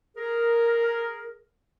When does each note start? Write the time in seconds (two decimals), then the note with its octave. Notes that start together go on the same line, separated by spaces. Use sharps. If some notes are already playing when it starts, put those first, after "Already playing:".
0.17 G#4 A#4